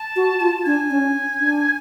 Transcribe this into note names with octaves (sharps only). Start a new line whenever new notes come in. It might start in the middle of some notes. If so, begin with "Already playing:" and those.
Already playing: A5
F#4
F4
D4 G#5
C#4
D4